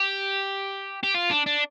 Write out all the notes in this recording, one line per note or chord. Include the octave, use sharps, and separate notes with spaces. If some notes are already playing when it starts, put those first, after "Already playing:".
Already playing: G4
G4
F4
D4
D4